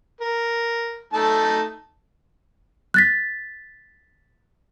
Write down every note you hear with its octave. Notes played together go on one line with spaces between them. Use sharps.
A#4
A3 D#4 A5
F#6 A6 B6